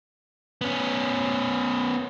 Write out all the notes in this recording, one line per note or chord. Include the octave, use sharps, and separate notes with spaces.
B3 C#4